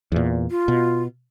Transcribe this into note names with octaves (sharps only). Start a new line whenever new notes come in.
E2 A#2
F4
B2